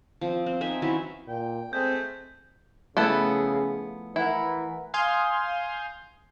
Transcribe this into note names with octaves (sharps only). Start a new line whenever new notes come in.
F3 C4
C4
C4 D#4 E5 G#5
E3 F#3 C#4 E5
A#2 G5
G#3 A3 C4 G6
C#3 F3 A3 B3 E4 A4 B4
E3 E4 A#4 F#5
F5 G#5 C6 D#6 F6 G6